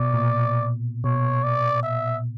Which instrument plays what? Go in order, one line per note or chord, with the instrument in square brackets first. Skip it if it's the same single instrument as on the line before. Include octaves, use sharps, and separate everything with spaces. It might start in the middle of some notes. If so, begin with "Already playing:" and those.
Already playing: [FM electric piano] B2 [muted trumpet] D5
[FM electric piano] A#2
[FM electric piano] B2 [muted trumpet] C#5
[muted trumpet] D5
E5